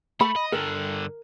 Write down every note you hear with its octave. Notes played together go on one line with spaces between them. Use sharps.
A3 B5
D#5
G2 D3 A#4